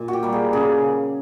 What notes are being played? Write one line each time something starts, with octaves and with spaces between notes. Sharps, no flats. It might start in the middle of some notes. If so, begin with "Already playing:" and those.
Already playing: A#2
F#4 G4
G3 A#3
G#4
C#3 G#4